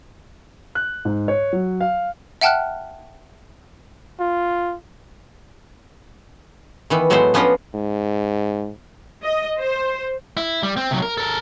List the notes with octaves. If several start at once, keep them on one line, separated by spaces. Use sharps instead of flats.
F#6
G#2
C#5
F#3
F5
E5 F#5 G5 A5 F6 F#6
F4
D#3 E3 B3
A2 F#3 G#3 A3 B3 C5
F3 B3 C#4 D4 F4 D#5
G#2
D#5
C5
E4
G3
C4
C3 F#3
A#4
A4 A#4